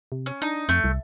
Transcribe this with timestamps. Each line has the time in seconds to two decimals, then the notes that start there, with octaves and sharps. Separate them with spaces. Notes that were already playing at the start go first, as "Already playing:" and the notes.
0.12 C3
0.26 C#4
0.42 D4 D#4
0.69 F2 A3
0.84 C2